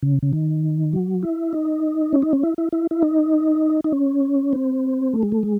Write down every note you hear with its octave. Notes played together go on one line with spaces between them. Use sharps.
C#3
C#3
D#3
F#3
E4
D#4
C#4
D#4
C#4
E4
E4
E4
E4
D#4
D#4
C#4
C4
A3
G#3
A3
G#3